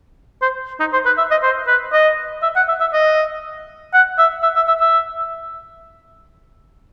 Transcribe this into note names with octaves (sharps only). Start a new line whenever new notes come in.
C5
D#4
C5
B4
E5
D#5
C5
B4
D#5
E5
F#5
E5
E5
D#5
F#5
E5
E5
E5
E5
E5